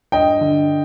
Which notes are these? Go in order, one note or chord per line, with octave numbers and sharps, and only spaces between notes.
G2 D#5 G5
D3